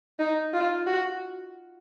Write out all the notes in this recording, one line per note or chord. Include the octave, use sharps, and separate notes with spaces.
D#4
F4
F#4